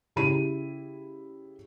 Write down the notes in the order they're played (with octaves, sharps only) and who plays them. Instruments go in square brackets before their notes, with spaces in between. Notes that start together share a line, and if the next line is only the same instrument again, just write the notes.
[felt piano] C#3 E4 G4 B5 D#7